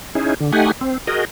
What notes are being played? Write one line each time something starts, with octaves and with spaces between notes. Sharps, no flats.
C#4 D#4 E4 G#4
D3
A3 D#4 G4 F#5 G#5
C4
F#4 G#4 A#4 D#5